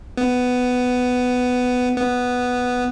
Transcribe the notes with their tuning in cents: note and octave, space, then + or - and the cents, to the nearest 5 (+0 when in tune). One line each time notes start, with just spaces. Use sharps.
B3 +10
B3 +0